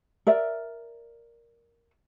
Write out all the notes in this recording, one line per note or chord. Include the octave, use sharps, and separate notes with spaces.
A#4 D5 E5